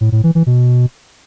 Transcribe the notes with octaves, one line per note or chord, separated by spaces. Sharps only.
A2
A2
E3
E3
B2